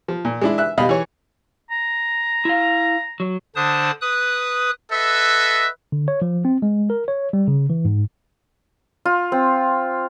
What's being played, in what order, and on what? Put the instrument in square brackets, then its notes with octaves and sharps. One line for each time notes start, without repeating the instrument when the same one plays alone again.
[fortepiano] F3
A#2
G#3 D4 E4
E5 F#6
B2 G3 D#5 F5 B5
E3 C#5
[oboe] A#5
[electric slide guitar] E4 F5
F#3
[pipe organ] D3 D4 C5 A5 D#6
B4 D#6 F#6
[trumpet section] A4 B4 D#5 E5 F#5
[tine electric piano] D3
C#5
F3
C4
G#3
A#4
C#5
G3
C#3
E3
G#2
[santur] F4
C4